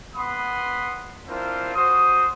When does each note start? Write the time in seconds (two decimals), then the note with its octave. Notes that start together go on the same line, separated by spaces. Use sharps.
0.15 B3 F#5 B5 C6 D#6
1.28 C4 D4 E4 F4 A#4 C5
1.75 F#4 C5 D#6